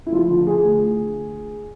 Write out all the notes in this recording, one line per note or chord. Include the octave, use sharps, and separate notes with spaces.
E4
F3 F4
D3
D3 G#4
D2